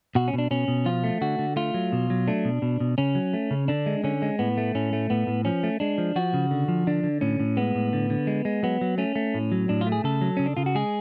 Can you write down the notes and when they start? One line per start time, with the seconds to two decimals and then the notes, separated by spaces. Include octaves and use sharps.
0.15 B2 F#4
0.28 C#4
0.34 B2 D4
0.51 B2 C#4
0.68 B2
0.85 F3 F4
1.04 A3
1.21 D3 F#4
1.39 D3
1.56 A3 F4
1.74 F#3
1.92 B2
2.10 F#3
2.28 A3 D4
2.45 B2
2.62 B2
2.80 B2
2.98 C#3 C#4
3.15 F#3
3.34 A3
3.51 C#3
3.68 D3 D4
3.86 G#3
4.04 D3 C#4
4.22 G#3
4.39 A2 B3
4.57 A3
4.75 A2 C#4
4.93 A3
5.10 A2 B3
5.27 A2
5.45 F3 C#4
5.63 A3
5.80 G#3 D4
5.98 F3
6.16 F3 F#4
6.34 C#3
6.51 D3
6.68 F3
6.87 D3 D4
7.04 D3
7.21 A2 C#4
7.40 A2
7.57 G#3 B3
7.75 A2
7.93 D3
8.10 D3
8.27 G#3
8.45 G#3
8.63 F#3 B3
8.81 F#3
8.98 A3 C#4
9.16 A3
9.34 A2
9.52 F#3
9.69 A2 D4
9.81 F4
9.87 A3
9.92 G#4
10.04 C#3 A4
10.21 F#3
10.37 C#3 C#4
10.46 D4
10.57 C#3 F4
10.66 F#4
10.75 G#3 G#4